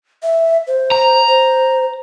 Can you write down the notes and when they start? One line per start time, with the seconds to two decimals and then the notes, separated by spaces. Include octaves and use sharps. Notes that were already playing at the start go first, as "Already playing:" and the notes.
0.23 E5
0.67 C5
0.92 A#5
1.27 C5